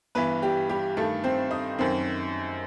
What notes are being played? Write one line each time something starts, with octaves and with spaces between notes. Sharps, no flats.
G2 E3 B3 B4
G3 G4
G3 G4
G2 D#3 A3 A4
C4 C5
D#4 D#5
F#2 D#3 C4 C5